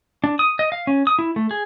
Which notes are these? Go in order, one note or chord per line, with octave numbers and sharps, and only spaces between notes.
D4
D#6
D#5
F5
C#4
D#6
E4
A3
G#4